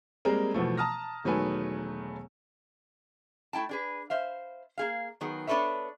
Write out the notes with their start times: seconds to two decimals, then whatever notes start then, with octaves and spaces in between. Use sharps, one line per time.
0.25 G3 G#3 A#3 C4 G#4 A#4
0.54 B2 E3 F3 A3
0.78 A5 A#5 D#6 F6 A#6
1.24 E1 D#3 F#3 A3 B4 G#5
3.53 A3 E4 G5 A5
3.69 D4 G#4 B4
4.10 C5 E5 F5
4.78 A#3 G#4 F5
5.21 D#3 F#3 B3 D#4 G#4
5.47 B3 D4 A4 B4 C#5 E5